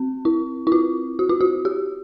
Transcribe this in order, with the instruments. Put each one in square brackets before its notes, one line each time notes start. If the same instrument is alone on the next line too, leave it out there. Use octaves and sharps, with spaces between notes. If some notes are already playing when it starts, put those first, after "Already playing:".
Already playing: [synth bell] C4
E4
E4
F4
F#4
F4
F#4
G4